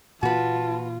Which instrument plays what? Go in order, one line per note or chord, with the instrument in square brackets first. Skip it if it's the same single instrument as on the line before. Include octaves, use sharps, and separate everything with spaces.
[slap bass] A#2 E3 A#3 [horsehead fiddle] F4 [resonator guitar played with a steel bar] F#4 B4 [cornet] A5